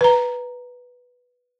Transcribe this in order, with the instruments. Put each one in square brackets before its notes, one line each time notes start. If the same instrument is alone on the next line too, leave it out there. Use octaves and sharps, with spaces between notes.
[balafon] B4 A#5